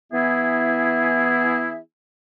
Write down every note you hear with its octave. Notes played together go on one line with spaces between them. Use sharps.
E3 B3 E4 G#4 E5